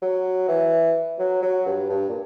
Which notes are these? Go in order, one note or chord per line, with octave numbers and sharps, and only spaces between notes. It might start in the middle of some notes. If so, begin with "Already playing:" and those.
F#3
E3
F#3
F#3
G2
G2
A#2